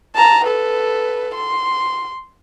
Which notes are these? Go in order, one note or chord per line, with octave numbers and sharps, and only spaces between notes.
A5 A#5
A4 B4
C6